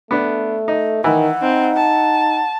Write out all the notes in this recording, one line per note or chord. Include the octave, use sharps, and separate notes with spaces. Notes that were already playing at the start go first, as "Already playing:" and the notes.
A3 B3 D4
D#4
D#3 E3 F#5
C4 D#4
A5